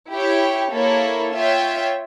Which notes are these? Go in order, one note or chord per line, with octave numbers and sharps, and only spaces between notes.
E4 G4 C#5 G5
A#3 E4 A4 C#5
F4 C#5 E5 G5